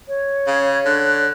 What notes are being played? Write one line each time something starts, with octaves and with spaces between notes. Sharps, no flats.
C#5
C#3 F5
D3 F#6